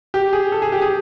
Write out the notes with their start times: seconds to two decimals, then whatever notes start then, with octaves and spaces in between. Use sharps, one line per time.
0.14 G4
0.33 G#4
0.52 A4
0.62 G#4
0.72 G4
0.82 G#4